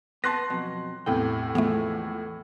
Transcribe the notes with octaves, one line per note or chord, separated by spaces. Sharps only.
B3 A5 C6 F#6 A#6
F2 B2 F#3
E2 A2 C3 G5
E3 F3 G#3 A3 B3